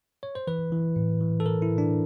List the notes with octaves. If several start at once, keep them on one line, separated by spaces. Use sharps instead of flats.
C#5
C5
E3 B4
E3
A2
E3
A4
E3 A#4
E4
A2
D4